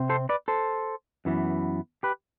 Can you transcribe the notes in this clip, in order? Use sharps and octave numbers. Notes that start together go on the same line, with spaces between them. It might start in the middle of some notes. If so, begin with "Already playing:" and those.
Already playing: C3 C4
A4 C5
B4 D5
A4 C5
F#2 E3 B3
G4 B4